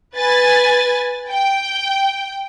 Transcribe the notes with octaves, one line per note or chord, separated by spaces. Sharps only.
B4 G#5 A6
G5